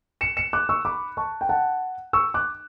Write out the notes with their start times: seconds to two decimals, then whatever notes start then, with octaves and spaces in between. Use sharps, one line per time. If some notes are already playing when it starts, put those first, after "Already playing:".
0.21 C#7 E7
0.37 C#7 E7
0.53 D6 F#6
0.69 C#6 E6
0.85 B5 D6
1.17 A5 C#6
1.41 G5
1.49 F#5 A5
2.13 C#6 E6
2.34 D6 F#6